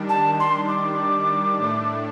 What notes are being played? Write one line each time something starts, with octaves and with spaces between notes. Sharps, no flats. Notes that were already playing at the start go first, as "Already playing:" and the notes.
Already playing: D#3 G3 D4
A5
C6
D6
A2 A3 D4